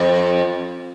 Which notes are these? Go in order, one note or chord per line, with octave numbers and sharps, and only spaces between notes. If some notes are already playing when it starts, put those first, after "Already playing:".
Already playing: F2